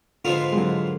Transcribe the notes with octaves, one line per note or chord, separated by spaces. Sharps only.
G#2 D3 F3 B3 F4
G#3
D3 F#3